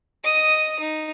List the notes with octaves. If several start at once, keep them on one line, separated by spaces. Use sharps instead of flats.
D#5 D#6
D#4